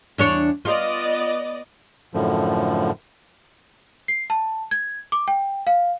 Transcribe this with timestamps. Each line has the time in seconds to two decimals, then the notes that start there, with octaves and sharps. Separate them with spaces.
0.18 E2 D4 C#5
0.65 B3 F4 D5 D#5
2.14 F#2 A2 D3 F3
4.08 C7
4.30 A5
4.71 G#6
5.12 D6
5.28 G5
5.67 F5